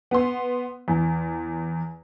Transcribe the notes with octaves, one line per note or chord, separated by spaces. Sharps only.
B3 C6
E2